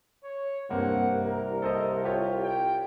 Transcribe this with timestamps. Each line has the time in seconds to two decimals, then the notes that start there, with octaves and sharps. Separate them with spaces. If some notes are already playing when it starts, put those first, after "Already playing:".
0.23 C#5
0.70 C2 G2 A#3 C4 F#5
1.27 A#4
1.62 A4 C5 D#5
2.04 F4 G4 C#5
2.43 G5